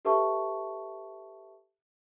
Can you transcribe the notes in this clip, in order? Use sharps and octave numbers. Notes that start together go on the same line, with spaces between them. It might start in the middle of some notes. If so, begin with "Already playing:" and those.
G4 A4 B4 E5 A5 C#6